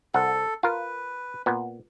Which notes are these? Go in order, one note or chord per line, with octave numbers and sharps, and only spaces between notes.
C2 A4 F#5
F4 A#4 B4
A#2 B3